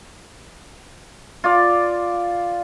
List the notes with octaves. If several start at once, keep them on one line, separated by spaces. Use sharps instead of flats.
F4 D5